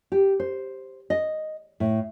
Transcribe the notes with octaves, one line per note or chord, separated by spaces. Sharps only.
G4
C5
D#5
A2